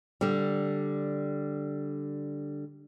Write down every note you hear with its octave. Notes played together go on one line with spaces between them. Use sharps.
D3 G3